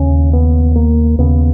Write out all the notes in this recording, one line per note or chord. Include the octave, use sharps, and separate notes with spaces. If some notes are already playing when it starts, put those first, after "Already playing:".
Already playing: D#2 C#3 C#4
B3
A#3
D#2 C#3 B3